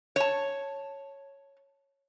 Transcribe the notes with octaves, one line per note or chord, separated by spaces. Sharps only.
C#5 A5